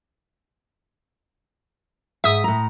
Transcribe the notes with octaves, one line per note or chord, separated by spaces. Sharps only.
G#2 E5 D#6
A2 A#5